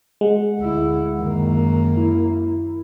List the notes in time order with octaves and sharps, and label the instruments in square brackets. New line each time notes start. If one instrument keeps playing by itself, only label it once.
[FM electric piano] G#3 [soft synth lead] F#5
[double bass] D2 E4
[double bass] F#2 A#3 [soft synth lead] D#3
[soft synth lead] E4